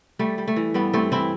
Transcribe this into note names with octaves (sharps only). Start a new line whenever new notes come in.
G3 A3
G3
A3
E3
G2 G3 B3
G2 A3 C4
E3 C4 E4